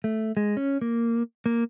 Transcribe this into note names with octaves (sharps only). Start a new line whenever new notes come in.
A3
G#3
C#4
A#3
A#3